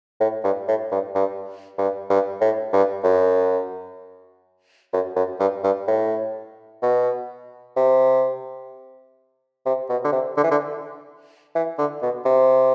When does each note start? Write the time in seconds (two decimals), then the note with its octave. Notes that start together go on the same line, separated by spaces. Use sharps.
0.20 A2
0.44 G2
0.68 A2
0.92 G2
1.15 G2
1.78 G2
2.10 G2
2.41 A2
2.73 G2
3.04 F#2
4.93 F#2
5.16 F#2
5.40 G2
5.64 G2
5.87 A2
6.82 B2
7.76 C3
9.66 C3
9.89 B2
10.04 D3
10.12 C3
10.37 D3
10.43 E3
10.51 D3
11.55 E3
11.78 D3
12.02 B2
12.25 C3